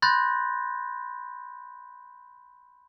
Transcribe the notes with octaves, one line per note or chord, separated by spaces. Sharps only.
B5 C6 F#6 G6 A6 A#6